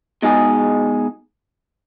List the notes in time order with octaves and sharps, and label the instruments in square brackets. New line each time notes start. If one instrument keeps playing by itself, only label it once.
[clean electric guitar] B2 G#3 D#4 G#4